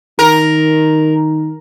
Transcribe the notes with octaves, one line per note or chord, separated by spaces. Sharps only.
D#3 A#4